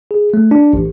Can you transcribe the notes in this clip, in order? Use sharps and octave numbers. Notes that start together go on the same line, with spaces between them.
G#4
A3
D4
A1